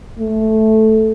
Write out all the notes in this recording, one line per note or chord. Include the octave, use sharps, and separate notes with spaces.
A3